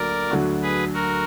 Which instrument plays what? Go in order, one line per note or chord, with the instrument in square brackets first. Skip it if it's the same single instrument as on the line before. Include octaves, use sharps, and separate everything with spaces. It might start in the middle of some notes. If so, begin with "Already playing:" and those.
Already playing: [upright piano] D2 D3 F#3 A#3 [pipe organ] A#4 D5
[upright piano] D2 D3 F#3 D4 F#4
[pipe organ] G#4 B4
F#4 A#4